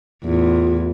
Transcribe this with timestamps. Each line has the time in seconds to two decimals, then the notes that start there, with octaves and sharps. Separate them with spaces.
0.25 E2 A2 F4